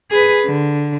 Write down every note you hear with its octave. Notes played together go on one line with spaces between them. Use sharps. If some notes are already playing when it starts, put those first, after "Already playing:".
G#4 B4
D3